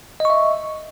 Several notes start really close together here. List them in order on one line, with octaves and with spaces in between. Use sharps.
D#5 C#6 E5